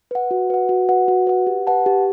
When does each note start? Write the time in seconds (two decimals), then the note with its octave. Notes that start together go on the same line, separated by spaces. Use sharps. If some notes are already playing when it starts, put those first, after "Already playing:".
0.11 B4 F#5
0.31 F#4
0.50 B4 F#5
0.69 F#4
0.89 B4 F#5
1.08 F#4
1.27 B4 F#5
1.47 G4
1.67 B4 F#5 A5
1.86 G4